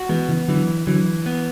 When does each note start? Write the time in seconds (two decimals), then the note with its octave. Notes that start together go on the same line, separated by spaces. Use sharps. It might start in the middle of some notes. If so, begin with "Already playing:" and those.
Already playing: F#4
0.09 E3 G#3 B3
0.29 C#3 E3
0.48 D3 E3 F#3
0.87 D3 E3 F#3
1.26 B3